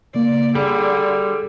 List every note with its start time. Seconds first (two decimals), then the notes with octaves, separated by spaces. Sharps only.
0.15 C#3 A#3 D5
0.55 D3 G3 G#4 A4